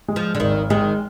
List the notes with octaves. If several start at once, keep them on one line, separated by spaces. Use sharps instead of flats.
G#3
F3
D3
G#1 D#3
D#3 G#3